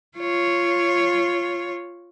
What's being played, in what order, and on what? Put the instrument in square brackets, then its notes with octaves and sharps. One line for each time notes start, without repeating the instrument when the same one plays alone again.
[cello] F4 C#5